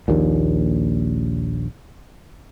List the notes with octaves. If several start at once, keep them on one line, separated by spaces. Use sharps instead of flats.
A#1 D#2 A#2